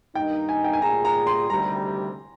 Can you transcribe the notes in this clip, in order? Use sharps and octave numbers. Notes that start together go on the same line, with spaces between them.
G2 D#3 A#3 D#4 G5
G#5
G5
G#5
A#2 G3 A#3 F4 G#4 A#5
A#5
C6
D2 C3 D#3 G3 A#5